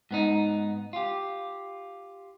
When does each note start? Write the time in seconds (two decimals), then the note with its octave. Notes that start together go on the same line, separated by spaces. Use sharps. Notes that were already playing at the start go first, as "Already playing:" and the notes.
0.11 G#2 B3 D#4
0.93 F4 G4